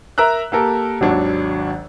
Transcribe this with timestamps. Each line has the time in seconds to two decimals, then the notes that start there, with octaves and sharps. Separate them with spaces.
0.18 A#4 E5 A#5 E6 F#6
0.52 A#3 G4 A4 A#4
1.01 G#1 D#2 F#3 D4 C#5